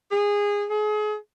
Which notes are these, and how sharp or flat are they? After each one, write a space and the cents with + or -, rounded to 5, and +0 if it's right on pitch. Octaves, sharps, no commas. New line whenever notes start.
G#4 -20
G#4 +35